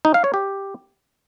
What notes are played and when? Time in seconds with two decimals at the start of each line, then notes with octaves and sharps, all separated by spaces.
0.05 D#4
0.14 F5
0.24 C#5
0.34 G4